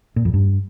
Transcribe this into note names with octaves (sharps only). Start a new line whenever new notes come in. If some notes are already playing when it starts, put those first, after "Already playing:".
A#2
F2
G2